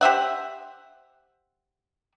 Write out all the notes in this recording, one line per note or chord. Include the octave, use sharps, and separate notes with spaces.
G4 C5 E5 F#5